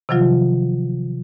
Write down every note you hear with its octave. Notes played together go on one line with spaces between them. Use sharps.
C3 D#3 F3 F#3 F4